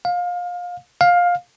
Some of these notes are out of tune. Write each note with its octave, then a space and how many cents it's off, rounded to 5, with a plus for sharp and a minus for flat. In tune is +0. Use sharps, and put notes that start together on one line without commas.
F5 +25
F5 +15